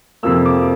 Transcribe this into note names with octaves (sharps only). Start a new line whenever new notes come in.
F2 C3 F3 A#3 E6
D6